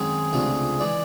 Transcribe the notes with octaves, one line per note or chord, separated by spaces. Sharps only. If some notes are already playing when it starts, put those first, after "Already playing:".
Already playing: F#2 D#3 G#3 C4 G#4
C#2 C3 F3 A3 D4
E3 G#3 D5